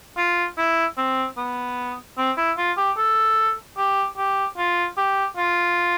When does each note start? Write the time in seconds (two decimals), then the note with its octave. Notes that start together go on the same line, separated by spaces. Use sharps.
0.17 F4
0.58 E4
0.97 C4
1.37 B3
2.17 C4
2.37 E4
2.58 F4
2.77 G4
2.97 A4
3.77 G4
4.17 G4
4.58 F4
4.97 G4
5.37 F4